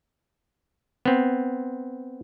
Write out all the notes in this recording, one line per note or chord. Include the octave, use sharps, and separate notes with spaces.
B3 C4